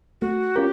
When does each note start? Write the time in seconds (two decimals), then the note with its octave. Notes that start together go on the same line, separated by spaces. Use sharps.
0.21 A3 F#4
0.56 C#4 F4 G4 A#4